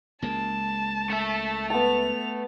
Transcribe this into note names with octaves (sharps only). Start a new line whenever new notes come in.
C#2 G#3 A#3 A5
A3 E5
B3 A5 F7